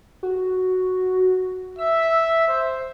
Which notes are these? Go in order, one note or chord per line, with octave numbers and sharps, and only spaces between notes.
F#4
E5 E6
C5